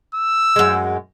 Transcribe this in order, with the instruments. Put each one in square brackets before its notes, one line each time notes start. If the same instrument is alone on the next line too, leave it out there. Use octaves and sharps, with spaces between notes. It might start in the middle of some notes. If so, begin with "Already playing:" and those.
[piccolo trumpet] E6
[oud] F#2 G#3